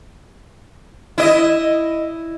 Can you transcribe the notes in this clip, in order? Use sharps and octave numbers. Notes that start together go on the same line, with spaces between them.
E4 D#5